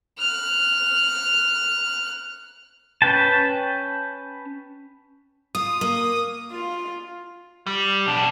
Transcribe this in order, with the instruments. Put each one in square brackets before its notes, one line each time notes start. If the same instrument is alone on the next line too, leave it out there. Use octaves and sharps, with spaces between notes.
[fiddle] F6 F#6
[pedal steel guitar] C#4 B4 G5 A5
[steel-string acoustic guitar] F4 [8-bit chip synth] D#6
[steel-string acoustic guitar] A#3
[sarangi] F4
[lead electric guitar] G3
B1 D4